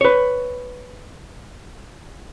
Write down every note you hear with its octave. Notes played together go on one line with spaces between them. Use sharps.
B4 C#5